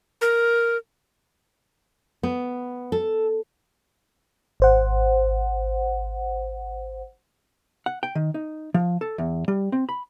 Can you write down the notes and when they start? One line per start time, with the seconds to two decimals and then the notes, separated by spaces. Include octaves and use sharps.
0.21 A#4
2.23 B3
2.92 A4
4.60 G#1 C5 F#5
7.86 F#5
8.03 G5
8.15 D#3
8.34 D#4
8.74 F3
9.01 A4
9.18 E2
9.48 G3
9.72 C4
9.89 B5